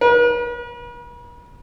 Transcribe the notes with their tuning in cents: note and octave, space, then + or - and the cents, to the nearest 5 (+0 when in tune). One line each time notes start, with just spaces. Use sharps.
B4 -45